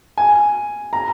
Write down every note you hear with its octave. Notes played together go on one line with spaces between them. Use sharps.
G#5
A#5